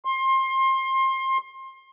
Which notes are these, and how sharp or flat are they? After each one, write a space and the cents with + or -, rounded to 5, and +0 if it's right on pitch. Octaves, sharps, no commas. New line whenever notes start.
C6 +25